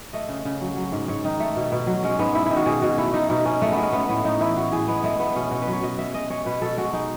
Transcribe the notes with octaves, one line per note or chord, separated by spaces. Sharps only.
A3 D#5
C#3
C#3
F#3
F#3
G#2
G#2 C#5
D#3 D#4
A3
B2
B2
F#3
G#3 C#4
G#2 B3
G#2 E4
E4
D#3
F#4
B2 G#4
B2 F#4
A3 E4
A3 D#4
B2 D#4
B2 C#4
G#3 A3
B3
G#3
C#4
A3 B3
A2 B3
A2 D#4
E3 E4
A2 F#4
A2 G#4
G#3 B3
G#3 A3
A3 B3
B2 C#4
B2 F#4
B4
F#3
C#5
B2 D#5
B2 E5
G#3 D#5
G#3 C#5
B2 B4
B2 A4
G#3 F#4
G#3 D#4